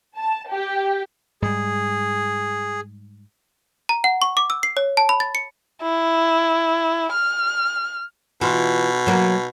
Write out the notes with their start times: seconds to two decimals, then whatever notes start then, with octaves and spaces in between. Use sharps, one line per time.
0.18 A5
0.50 G4
1.42 G#2 G3 G#4
3.89 A#5
4.04 F#5
4.22 C#6
4.37 D6
4.50 E6
4.63 C7
4.77 C#5
4.97 A5
5.09 B5
5.20 A6
5.35 C#7
5.82 E4
7.13 F6
8.41 B2 E3 F4
9.07 F#3 A#3